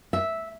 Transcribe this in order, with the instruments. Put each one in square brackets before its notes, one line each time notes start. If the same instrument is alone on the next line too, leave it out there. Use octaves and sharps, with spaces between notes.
[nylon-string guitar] E5